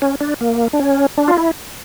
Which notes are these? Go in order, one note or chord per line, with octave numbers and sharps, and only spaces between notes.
C#4
D4
A#3
D4
C#4
D4
F4
E4